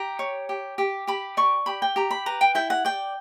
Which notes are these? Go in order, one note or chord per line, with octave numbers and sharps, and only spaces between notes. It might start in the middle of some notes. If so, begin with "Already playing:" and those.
Already playing: G4 A#5
C#5
G4
G4
G4 B5
D5 C#6
G4 B5
G5
G4 A#5
B5
B4 A#5
G5
E4 G5
F#5
D5 G5